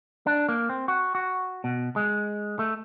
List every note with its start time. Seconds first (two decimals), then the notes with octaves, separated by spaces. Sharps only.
0.26 D4
0.49 A#3
0.69 C4
0.88 F#4
1.15 F#4
1.64 B2
1.96 G#3
2.59 A3